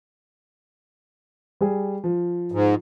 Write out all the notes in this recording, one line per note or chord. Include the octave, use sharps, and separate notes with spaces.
G3 G#4
F3
G#2